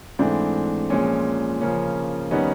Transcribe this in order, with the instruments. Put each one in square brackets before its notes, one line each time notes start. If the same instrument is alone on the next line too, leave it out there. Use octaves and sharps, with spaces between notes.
[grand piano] G#2 E3 A3 C4 D4
A#2 F3 G#3 C#4
C#3 F3 A#3 C#4
D#3 G3 B3 C#4 D#4